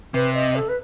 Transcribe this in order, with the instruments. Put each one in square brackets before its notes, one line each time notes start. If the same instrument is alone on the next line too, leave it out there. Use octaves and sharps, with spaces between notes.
[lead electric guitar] C3 [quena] B4
[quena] D#5
A4
B4